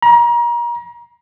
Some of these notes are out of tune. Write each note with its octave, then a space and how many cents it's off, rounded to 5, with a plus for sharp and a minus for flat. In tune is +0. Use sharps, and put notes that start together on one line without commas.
A#5 +30